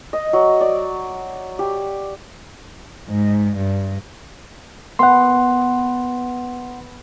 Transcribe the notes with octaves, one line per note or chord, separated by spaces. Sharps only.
D#5
F#3
D5
G4
G#2
G2
B3 F#5 C6